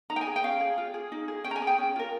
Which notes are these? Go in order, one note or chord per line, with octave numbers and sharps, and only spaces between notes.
D#4 A#5
G5
G#5
G#4
G5
C#4 F5
G#4
F4
G#4
D#4
G#4
C#4 G5
A#5
G#5
G#4
G5
C#4
F4 A#4